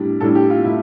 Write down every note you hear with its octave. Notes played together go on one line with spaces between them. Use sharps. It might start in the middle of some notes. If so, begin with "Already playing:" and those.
Already playing: A2 G3 D4
A2 G3 D4 A4
G4
F4
A2 E4